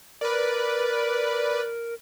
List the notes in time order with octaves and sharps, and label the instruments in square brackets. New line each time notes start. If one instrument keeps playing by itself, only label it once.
[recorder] A#4 [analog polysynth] B4 D5